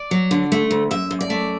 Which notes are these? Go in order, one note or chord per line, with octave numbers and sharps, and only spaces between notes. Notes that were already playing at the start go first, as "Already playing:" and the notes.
Already playing: D5
F#3
D3
A3
D2
F#2 E5
F#2
D5
A3